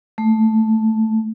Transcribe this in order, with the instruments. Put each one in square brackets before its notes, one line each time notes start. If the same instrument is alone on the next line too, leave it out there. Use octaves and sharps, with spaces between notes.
[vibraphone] A3